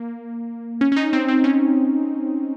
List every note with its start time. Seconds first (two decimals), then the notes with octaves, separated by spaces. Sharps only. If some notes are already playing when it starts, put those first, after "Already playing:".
Already playing: A#3
0.81 C#4
0.92 C#4
0.96 D#4
1.13 C4
1.28 C4
1.44 C#4